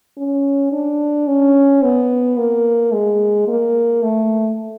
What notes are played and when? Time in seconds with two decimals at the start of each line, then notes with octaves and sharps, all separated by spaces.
0.17 C#4
0.72 D4
1.27 C#4
1.83 B3
2.38 A#3
2.92 G#3
3.48 A#3
4.02 A3